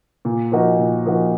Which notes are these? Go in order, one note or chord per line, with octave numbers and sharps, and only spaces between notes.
A#2
F3 A#3 D#4 F#4
A#2
F3 A#3 D#4 F#4